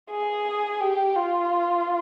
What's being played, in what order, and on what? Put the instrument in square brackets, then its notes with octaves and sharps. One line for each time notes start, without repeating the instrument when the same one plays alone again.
[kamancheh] G#4
G4
F4